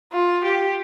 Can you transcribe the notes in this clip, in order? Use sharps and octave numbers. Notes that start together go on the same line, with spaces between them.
F4
G4